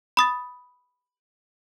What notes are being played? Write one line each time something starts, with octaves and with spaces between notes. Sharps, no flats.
B5 D#6 A6